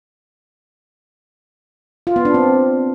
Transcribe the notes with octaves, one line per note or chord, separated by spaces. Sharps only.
F4
B3
D4
C4